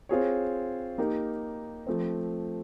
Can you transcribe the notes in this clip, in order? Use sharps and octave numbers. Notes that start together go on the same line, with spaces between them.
C4 F4 G#4 C#5
A#3 D#4 G4 A#4
F3 A3 C4